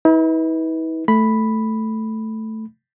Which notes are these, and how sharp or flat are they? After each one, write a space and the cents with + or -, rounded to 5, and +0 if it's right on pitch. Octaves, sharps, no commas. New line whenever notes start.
E4 -45 B4 -10
A3 +0 B5 +0